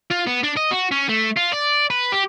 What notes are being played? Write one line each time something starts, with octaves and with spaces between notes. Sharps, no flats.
F4
B3
D4
D#5
F#4
C#4
A3
F4
D5
B4
G4